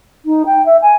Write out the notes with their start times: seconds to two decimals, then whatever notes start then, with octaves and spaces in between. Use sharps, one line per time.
0.25 D#4
0.46 G5
0.65 E5
0.81 G#5